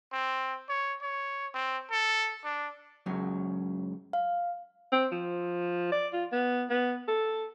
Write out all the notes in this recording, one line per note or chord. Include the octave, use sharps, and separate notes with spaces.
C4
C#5
C#5
C4
A4
D4
C#2 F#2 F#3
F5
C4
F3
D5
F4
B3
B3
A4